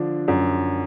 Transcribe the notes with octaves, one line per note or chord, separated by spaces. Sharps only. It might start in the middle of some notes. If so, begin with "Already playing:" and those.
Already playing: D3 F3 D4
F#2